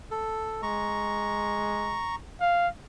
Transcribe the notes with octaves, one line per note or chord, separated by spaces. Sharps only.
A4
G#3 A#5 C#6
F5